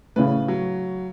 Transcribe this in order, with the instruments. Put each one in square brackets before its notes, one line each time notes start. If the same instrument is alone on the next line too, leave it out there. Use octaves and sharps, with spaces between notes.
[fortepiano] A2 C#3 [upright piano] B4
[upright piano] F#3